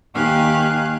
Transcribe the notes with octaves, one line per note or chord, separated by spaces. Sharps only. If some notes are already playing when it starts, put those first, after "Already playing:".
D#2 D#3 G4 F5 G#5 F#6